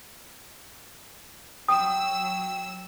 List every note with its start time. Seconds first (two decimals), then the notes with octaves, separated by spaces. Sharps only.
1.68 F#3 G5 D#6 E6